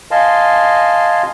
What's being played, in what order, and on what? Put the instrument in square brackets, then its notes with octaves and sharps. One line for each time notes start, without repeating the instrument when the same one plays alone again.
[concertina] D#5 F5 G#5 A5 C6